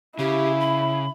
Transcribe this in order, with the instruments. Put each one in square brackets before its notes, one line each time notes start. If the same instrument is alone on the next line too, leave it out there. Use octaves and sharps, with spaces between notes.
[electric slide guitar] C#3 [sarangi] E4 [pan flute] G4
[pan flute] B5